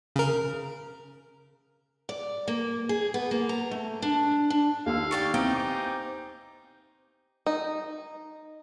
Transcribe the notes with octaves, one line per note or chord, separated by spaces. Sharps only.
C#3 A#4
D5
A#3
G#4
B3
A#3
A#5
A3
D4
D4
D#2 F5 E6
G4 D5 C#6
B3 C4 D#4 E4 G4 D7
C5 G#5 D6
D#4